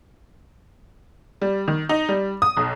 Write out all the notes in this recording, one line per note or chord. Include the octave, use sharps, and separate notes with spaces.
G3
D#3
D#4
G3
D#6
B1